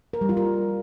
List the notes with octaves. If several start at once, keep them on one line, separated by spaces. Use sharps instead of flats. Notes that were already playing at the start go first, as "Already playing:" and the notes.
A#4
G3
F4
A#4